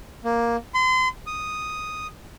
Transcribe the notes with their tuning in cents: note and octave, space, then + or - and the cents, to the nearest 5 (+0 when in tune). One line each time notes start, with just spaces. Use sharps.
A#3 +5
C6 -35
D#6 +0